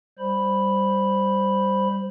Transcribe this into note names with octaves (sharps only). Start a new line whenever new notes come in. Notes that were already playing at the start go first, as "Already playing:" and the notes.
G3 C5 B5